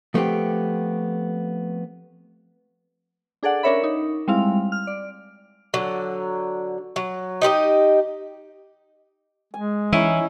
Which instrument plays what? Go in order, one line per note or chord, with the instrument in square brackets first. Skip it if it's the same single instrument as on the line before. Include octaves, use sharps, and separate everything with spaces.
[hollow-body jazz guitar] F3 A3 B3 C4 G4
[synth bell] D4 G#4 A4 D5 F#5
C#4 D4 A#4 C#5 E5 B5
D#4
G3 G#3 C4 E4 F5
F6
D5
[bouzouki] D3 F#3
F#3
D#4 G4 B4 D#5
[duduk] G#3 [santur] G#5
[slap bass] E3 [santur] C#4 D#4 C5 [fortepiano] E4